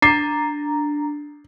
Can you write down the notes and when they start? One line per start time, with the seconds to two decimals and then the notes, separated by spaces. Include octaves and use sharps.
0.02 D4 A#5 C7